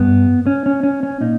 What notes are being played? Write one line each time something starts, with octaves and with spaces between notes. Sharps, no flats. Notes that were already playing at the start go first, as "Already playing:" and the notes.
Already playing: G2 B3
C#4
C#4
C#4
C#4
A#2 D#4